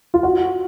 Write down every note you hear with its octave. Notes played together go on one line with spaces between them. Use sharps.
F4
F#4